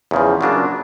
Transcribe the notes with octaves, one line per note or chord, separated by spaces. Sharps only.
E2 C#3 F3
C#3 F#3 A#3 D4 F4